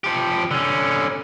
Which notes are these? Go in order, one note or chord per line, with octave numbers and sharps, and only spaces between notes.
F3 G4
D3 C#4